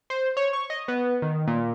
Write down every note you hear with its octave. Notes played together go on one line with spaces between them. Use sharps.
C5
C#5
C#6
D#5
B3
D#3
A#2